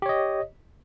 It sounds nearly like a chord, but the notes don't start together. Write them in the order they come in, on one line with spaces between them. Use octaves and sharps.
G4 C#5 D#5